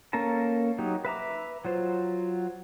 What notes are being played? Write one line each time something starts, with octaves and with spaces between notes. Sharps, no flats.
A#3 C#4 A4 A#4 A5
F#3 D#4 G4
B4 E5 A#5 D6
F#3 F4 C5